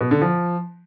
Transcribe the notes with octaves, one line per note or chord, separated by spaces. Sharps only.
B2
D3
F3